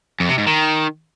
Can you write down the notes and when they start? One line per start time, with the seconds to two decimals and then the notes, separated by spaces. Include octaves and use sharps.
0.20 F2
0.29 C3
0.38 G#2
0.47 D#3